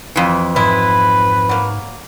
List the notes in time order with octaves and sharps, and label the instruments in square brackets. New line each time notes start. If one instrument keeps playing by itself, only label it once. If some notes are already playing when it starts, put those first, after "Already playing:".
[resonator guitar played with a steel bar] F2 E3
[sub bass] G#2 [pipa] G#3 E4 [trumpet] B4
[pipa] F#3 A#3